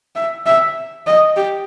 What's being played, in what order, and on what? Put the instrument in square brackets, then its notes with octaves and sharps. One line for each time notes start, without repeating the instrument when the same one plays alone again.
[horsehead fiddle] E5
E5
D#5
G4